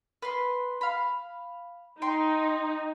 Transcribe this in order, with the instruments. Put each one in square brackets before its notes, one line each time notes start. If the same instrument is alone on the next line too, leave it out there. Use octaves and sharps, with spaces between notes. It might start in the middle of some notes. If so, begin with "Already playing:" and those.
[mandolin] B4 C6
F5 B5
[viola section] D#4 [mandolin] G5 C6